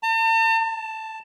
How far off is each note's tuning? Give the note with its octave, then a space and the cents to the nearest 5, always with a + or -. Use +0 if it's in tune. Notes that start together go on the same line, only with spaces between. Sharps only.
A5 +45
A5 +5